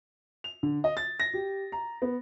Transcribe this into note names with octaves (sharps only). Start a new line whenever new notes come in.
F7
D3
D#5
A6
A#6
G4
A#5
B3